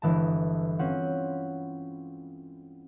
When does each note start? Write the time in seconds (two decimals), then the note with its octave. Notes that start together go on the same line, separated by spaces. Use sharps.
0.02 G1 E3 G#3 A5
0.79 C4 C#4 F4 F#5